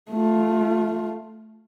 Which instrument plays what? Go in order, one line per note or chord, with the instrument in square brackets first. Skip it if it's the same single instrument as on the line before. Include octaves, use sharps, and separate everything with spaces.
[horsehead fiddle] A3 F4